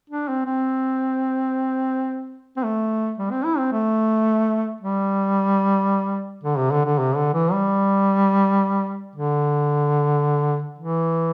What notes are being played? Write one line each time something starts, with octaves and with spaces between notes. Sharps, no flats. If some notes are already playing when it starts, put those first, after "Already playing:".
D4
C4
C4
C4
A3
G3
C4
E4
C4
A3
G3
D3
C3
D3
D3
C3
D3
E3
G3
D3
E3